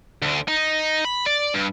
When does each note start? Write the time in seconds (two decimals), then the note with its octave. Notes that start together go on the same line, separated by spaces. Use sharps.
0.22 D2 D3
0.48 D#4
1.05 B5
1.26 D5
1.54 G2